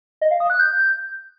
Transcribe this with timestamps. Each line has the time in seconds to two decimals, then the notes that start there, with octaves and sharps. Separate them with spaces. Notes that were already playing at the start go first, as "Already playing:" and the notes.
0.21 D#5
0.31 F5
0.40 D#6
0.50 F#6
0.59 G6